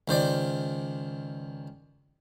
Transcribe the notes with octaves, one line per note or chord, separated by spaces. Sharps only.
C#2 D#3 C5 D5